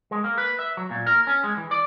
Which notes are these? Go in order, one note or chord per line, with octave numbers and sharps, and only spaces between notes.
G#3
A#3
B4
E5
F#3
A#2
A#4
C#4
G#3
E3
D5